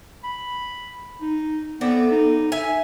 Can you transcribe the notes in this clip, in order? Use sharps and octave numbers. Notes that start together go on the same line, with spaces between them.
B5
D#4
A2 B3 C4 D5
D#4
E5 G#5